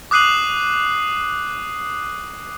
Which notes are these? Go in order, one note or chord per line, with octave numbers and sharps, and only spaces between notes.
D6 D#6 F#6 C7 D#7 F#7